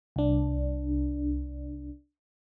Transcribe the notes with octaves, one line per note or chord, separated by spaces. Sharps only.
C2 D4